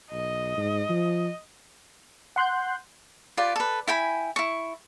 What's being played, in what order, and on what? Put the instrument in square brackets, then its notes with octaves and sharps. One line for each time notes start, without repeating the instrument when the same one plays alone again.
[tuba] B1 [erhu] D#5
[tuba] G#2
F3
[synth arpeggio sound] F#5 C6 F#6 G6
[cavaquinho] F4 G4 B4 D5
A4 B4
E4 G5 G#5 B5
E4 C#6